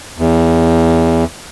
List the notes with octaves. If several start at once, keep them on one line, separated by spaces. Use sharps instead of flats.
E2